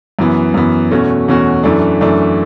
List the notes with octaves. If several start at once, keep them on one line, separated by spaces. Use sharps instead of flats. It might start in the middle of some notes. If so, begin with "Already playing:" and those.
F#2 E3 B3
F#2 E3 B3
E2 B2 A3 C#4 F#4
E2 B2 A3 C#4 F#4
F#2 E3 A3 D4
F#2 E3 A3 D4